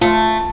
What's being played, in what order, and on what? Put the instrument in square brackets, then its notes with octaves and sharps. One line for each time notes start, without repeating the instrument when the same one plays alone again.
[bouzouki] A3 [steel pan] F4